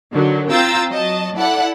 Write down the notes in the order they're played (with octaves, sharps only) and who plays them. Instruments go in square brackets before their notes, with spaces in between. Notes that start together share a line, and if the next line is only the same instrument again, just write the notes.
[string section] D3 D#3 F#3
C4 F4 G5 A#5 E6 A6
F#3 D#5 A5
E4 A4 D5 F#5